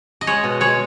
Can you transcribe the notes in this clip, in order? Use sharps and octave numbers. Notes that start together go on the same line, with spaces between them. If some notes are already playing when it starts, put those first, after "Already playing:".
D#5
G#3 C#5
B2
G#3 C#5